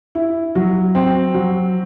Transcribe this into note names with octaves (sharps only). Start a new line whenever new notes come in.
E4
F#3
C4
F#3